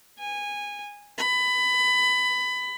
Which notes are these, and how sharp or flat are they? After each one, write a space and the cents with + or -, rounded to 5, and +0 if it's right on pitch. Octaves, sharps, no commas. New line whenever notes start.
G#5 -20
B5 +20